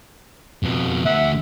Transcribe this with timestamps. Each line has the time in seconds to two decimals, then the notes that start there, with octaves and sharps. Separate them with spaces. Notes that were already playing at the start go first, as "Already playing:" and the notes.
0.63 F2 B2
1.05 D2 E5 F#5